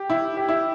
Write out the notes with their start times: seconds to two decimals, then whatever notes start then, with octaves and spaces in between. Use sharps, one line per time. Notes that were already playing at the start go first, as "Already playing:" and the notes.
Already playing: G4
0.10 E4
0.37 G4
0.48 E4